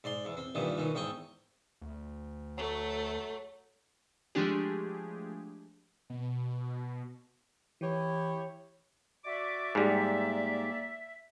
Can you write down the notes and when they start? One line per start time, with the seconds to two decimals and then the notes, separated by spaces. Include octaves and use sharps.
0.04 G#2 D5 C6
0.25 E2
0.37 C4
0.55 G2 A#2 D#3 E3
0.78 B1 D#3 E3
0.95 E2 G#2 G5 C#6 D#6
1.82 D2
2.57 F#3 A3
4.35 F3 G#3 A3 D4 G4 G#4
6.10 B2
7.81 E3 E4 G4 C#5
9.25 F#4 D5 E5 D6
9.75 G#2 G3 A#3 D5